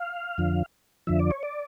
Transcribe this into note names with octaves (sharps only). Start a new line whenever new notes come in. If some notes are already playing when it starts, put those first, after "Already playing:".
Already playing: F5
F2 D3 F3
F2 D3 F3 E5
D5
C#5
D5